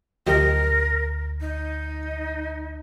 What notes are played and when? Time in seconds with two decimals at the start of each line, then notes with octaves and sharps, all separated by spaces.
0.27 D2 F3 G4 A#4 D#5
1.41 D#4